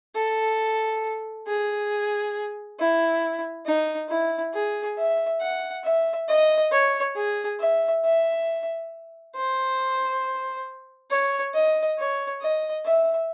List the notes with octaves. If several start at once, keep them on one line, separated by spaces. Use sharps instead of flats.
A4
G#4
E4
D#4
E4
G#4
E5
F#5
E5
D#5
C#5
G#4
E5
E5
C5
C#5
D#5
C#5
D#5
E5